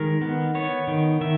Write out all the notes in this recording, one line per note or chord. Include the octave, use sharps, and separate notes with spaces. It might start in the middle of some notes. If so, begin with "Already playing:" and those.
Already playing: D#3 G#3 A#4
B3
B3 C#5
D#3
D#3 E5